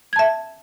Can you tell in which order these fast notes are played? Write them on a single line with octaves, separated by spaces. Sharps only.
G#6 A5 E5